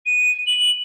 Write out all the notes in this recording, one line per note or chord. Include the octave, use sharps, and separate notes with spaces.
D#7
F#7